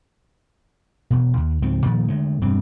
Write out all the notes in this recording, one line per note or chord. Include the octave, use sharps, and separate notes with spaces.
E1 B2
D#2
C#2 G#2 F3 C4
A#2 D#3 F3
D3 G#3 A3
E1 G2 C4